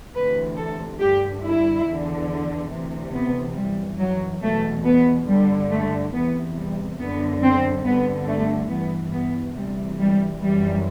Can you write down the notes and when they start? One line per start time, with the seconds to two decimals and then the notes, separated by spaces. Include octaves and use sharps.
0.15 D2 C3 E3 B4
0.57 A4
1.00 G2 D3 G4
1.43 E4
1.87 E2 D3
2.71 D2 C3 E3
3.15 B3
3.56 F#2 E3 G3
4.00 F#3
4.43 E2 B2 A3
4.86 B3
5.28 G2 D3 G3
5.71 A3
6.13 E2 C3 E3 B3
6.57 G3
7.00 F#2 D3 B3
7.42 C4
7.85 G2 D3 B3
8.28 A3
8.70 G2 E3 B3
9.13 B3
9.55 D2 C3 E3 G3
9.99 G3
10.41 F#2 E3 G3